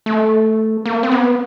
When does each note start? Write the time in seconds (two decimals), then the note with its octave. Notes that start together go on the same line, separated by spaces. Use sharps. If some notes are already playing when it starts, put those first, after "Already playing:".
0.06 A3
0.86 A#3
1.03 C4
1.12 B3